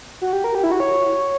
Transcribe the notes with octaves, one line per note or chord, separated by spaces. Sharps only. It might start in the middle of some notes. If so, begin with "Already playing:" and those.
F#4
G4
A#4
G4
E4
F#4
C#5